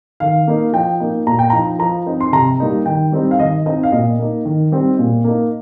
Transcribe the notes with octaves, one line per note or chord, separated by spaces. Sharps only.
D#3 F5
A#3 D#4
F3 G5
A#3 D#4
A#2 A#5
G5
F3 D#4 A#5
F3 A#5
C4 D#4
C6
C3 A#5
G3 A#3 D#4
D#3 G5
G3 C4 D#4
F5
D#3 D#5
C4 D#4 D#5
F5
A#2 D#5
A#3 D#4
D#3
G3 C4 D#4
A#2
A#3 D#4